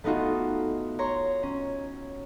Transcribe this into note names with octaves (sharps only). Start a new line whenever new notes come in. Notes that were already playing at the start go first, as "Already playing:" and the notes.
A3 B3 D#4 F4 F#4
C#5 A#5 C6
C#4